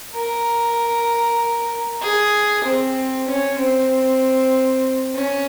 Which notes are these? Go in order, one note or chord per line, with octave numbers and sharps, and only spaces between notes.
A#4
G#4
C4
C#4
C4
C#4